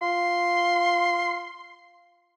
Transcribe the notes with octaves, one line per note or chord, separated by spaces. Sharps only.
F4 C6